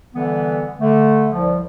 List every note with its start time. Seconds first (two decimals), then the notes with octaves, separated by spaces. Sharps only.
0.14 D3 E3 G3 B3
0.81 D3 A3
1.32 C2 F3